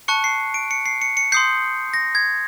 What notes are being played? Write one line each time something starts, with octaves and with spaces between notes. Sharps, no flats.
A5 C#6 F#6 C#7
C7
D7
C#7
C7
C#7
C#7
C6 D#6 G6 C7
A#6
G#6